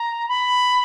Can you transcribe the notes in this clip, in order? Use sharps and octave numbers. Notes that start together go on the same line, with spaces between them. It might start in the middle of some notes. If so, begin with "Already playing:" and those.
Already playing: A#5
B5